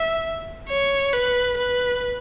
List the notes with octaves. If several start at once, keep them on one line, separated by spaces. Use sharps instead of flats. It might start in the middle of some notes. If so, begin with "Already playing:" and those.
Already playing: E5
C#5
B4
B4